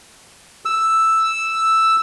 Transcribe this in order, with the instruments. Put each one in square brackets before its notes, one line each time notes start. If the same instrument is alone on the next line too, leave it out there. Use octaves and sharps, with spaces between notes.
[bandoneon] E6